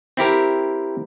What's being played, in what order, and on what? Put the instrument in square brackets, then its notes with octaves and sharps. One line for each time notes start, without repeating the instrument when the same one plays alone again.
[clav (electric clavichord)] C4 E4 G4 A#4